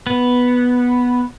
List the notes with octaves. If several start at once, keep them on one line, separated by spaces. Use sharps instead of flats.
B3